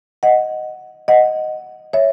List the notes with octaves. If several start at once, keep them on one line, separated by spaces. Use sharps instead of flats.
D#5 F#5
D#5 F#5
C#5 E5